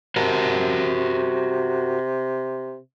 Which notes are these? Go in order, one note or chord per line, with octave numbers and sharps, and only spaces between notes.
C3 F#4 A#4 A5